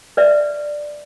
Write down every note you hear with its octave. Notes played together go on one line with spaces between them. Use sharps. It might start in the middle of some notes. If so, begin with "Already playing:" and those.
B4 D5 E5